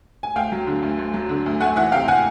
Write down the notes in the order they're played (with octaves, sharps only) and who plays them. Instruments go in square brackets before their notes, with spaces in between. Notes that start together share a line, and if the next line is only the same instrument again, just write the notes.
[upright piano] G#5
D2 F5 G5
F#3
D3
D2
D2
F#3
D3
D2
A3 F#5 G#5
E3 E5 F#5
C3 F5 G5
F#5 G#5